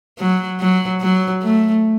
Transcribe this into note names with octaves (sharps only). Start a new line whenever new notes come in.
F#3
F#3
F#3
A3